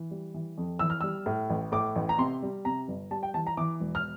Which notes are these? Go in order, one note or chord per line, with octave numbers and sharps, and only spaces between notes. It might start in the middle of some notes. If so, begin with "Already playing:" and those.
Already playing: E3
G3
E3
F2
E3 E6
F6
G3 E6
A2
A1
A2 D6
A1
A#5
C3 C6
G3
C3 A#5
G1
G3 A5
G5
E3 A5
A#5
E3 D6
E1
F6